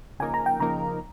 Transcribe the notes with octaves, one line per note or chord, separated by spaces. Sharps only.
C#3 F3 A#3 D#4 A#4 G#5
A#5
G5
C#3 F3 A#3 D#4 A#4 A#5